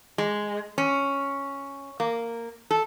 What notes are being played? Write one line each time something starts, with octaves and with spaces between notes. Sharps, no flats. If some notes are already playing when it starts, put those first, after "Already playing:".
G#3
C#4
A#3
A4